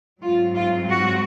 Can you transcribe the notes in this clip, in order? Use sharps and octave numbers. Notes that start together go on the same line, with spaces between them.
G#2 F#3 C4 F4
F4
F#4